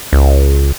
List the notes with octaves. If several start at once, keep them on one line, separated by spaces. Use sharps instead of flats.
C#2